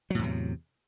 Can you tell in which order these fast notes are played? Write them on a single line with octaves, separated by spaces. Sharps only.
F#3 A2 E2 C3